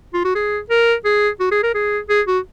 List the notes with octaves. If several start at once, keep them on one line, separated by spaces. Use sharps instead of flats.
F4
F#4
G#4
A#4
G#4
F#4
G#4
A#4
G#4
G#4
F#4